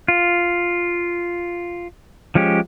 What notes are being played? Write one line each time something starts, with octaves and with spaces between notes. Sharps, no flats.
F4
F3 G#3 C#4 G4